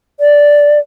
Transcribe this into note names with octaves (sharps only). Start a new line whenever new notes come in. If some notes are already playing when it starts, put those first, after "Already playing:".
D5